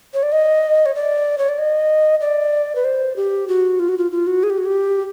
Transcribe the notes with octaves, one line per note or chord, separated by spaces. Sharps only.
C#5
D5
D#5
C#5
D5
C#5
D5
D#5
D5
B4
C5
G4
F#4
F4
F#4
F4
F4
F#4
G#4
G4
F#4
G4